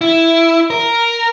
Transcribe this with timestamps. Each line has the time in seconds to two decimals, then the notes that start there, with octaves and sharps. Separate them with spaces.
0.01 E4
0.70 A#4